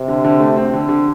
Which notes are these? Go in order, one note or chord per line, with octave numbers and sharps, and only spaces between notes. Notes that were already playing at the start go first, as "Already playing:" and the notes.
Already playing: C3
D3
D3
A3
C4
D3
D3